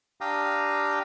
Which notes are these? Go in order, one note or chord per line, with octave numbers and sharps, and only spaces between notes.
D4 G4 F5 G5 A#5 D#6